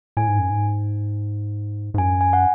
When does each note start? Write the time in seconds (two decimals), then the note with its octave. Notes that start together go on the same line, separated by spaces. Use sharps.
0.17 A2 G#5
0.28 G#2
0.39 F#2
0.50 G#2
1.94 G#2
1.98 F#2 G#5
2.21 G#5
2.33 F#5